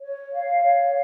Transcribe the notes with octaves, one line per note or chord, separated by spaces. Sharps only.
C#5
F5
C#5
F5